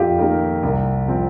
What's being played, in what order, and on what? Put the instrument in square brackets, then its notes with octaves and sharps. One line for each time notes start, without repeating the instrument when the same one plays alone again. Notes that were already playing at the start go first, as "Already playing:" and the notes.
Already playing: [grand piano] F2 [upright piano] F4 G4
[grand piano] D#3 A#3
C2
C3 F3 C4